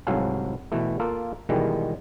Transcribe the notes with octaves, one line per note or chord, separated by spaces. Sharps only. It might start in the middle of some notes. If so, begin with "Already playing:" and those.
C2 G#2 F#3 A4 F5 G#5
B2 E3 A3
A#3 F4 A4
B2 D#3 E3 G3 G#3